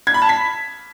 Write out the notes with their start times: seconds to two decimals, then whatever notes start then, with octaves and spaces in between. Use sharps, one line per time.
0.07 G#6
0.14 B5
0.22 A5
0.29 B6